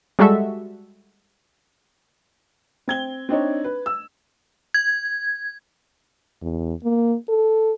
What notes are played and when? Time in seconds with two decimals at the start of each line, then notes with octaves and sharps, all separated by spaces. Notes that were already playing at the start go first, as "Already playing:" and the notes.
0.19 G3 G#3 F#4 A4 E5
2.88 C4 G#6 G7
3.29 C4 D4 D#4 C#5
3.64 B4
3.86 E6
4.74 G#6
6.42 E2
6.84 A#3
7.29 A4